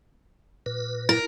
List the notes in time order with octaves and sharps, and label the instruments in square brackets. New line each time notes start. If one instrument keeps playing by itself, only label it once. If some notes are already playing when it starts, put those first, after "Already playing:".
[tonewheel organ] A#2 B4
[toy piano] E4 [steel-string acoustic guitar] A#4